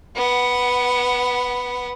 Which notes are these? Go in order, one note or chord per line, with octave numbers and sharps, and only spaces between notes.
B3 F#5